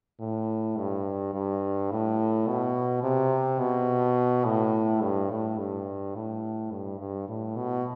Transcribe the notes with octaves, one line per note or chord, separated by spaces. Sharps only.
A2
G2
G2
A2
B2
C3
B2
A2
G2
A2
G2
A2
G2
G2
A2
B2